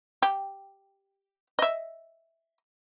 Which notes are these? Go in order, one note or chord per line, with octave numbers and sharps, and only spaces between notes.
G4
D#5 E5